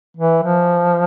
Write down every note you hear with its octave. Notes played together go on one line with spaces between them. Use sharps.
E3
F3